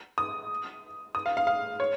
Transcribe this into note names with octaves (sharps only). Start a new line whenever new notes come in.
D#6
D#6
F5
F5
F5
C#5